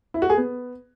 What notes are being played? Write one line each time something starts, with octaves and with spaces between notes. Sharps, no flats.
E4
F#4
G#4
B3